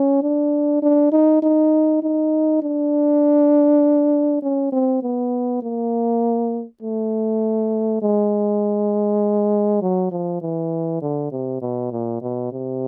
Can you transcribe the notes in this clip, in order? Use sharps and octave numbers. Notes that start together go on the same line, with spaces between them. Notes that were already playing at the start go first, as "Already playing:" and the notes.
Already playing: C#4
D4
D4
D#4
D#4
D#4
D4
C#4
C4
B3
A#3
A3
G#3
F#3
F3
E3
D3
C3
B2
A#2
B2
C3